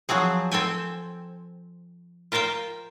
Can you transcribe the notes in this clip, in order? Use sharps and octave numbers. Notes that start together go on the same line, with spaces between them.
F3 F#3 C4 G#4
C4 A4 G5 G#5
F4 A#4 C5 F5 G5